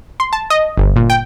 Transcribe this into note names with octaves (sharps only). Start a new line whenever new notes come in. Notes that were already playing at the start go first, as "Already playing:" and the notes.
C6
A5
D#5
G1
A#2
G5